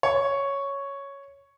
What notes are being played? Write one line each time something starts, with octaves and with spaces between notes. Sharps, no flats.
C#5